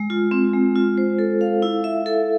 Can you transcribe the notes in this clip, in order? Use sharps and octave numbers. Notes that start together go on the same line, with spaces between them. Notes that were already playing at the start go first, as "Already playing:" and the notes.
Already playing: G#3
F4
C4
G#3
F4
C5
A4
F5
E4
E5
A4